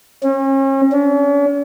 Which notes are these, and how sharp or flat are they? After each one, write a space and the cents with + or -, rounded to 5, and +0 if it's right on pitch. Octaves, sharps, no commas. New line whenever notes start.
C#4 -40
C#4 +45